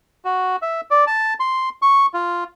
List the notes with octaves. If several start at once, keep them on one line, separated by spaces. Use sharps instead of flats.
F#4
E5
D5
A5
C6
C#6
F4